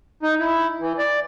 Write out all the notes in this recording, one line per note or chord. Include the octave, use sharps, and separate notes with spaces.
D#4
E4
E3
D5